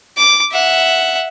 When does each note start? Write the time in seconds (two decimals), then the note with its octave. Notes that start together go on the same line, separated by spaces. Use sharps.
0.17 D6
0.52 E5 F#5